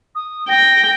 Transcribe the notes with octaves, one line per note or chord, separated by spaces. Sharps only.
D#6
G5 A#6